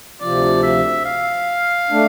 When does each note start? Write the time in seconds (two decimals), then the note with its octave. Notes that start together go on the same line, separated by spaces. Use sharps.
0.21 D2 C3 F3 D5
0.63 E5
1.05 F5
1.90 A3 D4